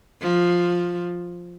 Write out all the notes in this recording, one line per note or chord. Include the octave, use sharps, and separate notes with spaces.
F3